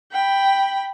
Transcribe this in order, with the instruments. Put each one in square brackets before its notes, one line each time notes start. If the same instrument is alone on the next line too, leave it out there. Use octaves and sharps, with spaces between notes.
[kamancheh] G5 B5